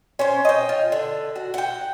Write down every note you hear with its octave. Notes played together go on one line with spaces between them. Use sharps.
C#4 C5
D#5 G5
F4
D3
F#4
F#5 G5